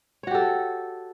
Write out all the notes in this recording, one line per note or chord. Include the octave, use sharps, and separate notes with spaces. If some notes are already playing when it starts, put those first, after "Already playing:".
F#4 G4 A4 C#5